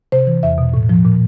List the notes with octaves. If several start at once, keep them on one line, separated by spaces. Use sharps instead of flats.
C3 C5
E3
E2 E5
B2
A2
F3
A#2